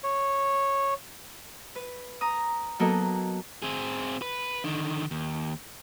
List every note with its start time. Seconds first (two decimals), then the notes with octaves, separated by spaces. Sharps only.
0.03 C#5
1.76 B4
2.21 A#5 D#6
2.79 F#3 A#3 B3 A4 A#4 D#5
3.62 C4 G#4
4.22 B4
4.64 D3 D#3
5.11 D#2